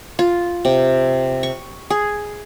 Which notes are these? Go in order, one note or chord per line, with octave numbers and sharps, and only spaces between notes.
F4
C3
C#6
G#4